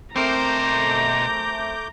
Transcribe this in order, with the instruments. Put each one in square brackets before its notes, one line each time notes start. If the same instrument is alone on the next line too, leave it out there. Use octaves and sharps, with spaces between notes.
[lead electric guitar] B2 C5 [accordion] A3 D6 G6 [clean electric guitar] C4 A#4 [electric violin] A#5